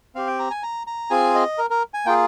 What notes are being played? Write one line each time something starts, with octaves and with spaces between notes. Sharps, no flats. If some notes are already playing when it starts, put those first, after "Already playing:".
C4 G4 F5
G5
A#5
G#5
A#5
A#5
C4 F4 G#4 G#5
D#5
A#4
A#4
G#5
A#3 F4 G#4 G5